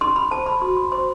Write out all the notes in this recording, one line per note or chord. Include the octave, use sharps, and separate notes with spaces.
D#4 C6
B5
C5 A5
B5
F#4 C6
C6
C5 C6